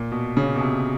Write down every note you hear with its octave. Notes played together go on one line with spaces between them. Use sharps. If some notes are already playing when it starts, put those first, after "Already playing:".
Already playing: A#2
B2
C#3
B2
C3